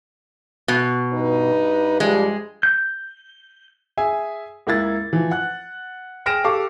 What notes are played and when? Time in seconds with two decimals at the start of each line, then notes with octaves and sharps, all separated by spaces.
0.68 B2
1.11 G2 D#4 B4
2.00 G2 F3 G3 G#3
2.63 G6
3.97 G#4 E5 G#5
4.67 C#2 A#3 E4 G#6 A6
5.13 E3 F3
5.31 F#5 F#6
6.26 G#4 G5 F6 A#6 D7 E7
6.44 G4 A4 F5 A5 C#6 D6